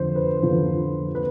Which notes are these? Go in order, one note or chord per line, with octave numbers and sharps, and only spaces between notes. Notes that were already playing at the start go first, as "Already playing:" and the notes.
Already playing: F2 D3 F3 C5
B4
F2 D3 F3 B4
B4